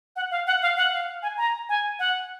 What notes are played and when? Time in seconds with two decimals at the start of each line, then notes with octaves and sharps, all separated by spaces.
0.16 F#5
0.31 F5
0.47 F#5
0.62 F5
0.77 F#5
0.93 F5
1.23 G#5
1.37 A#5
1.69 G#5
1.99 F#5